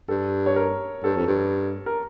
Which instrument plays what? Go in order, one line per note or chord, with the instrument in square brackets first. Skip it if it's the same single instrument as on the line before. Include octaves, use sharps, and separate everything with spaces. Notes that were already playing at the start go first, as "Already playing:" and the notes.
[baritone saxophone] G2 [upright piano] A4
[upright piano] C#5
A#4
[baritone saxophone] G2 [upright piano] A4
[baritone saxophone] F2
G2
[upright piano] A#4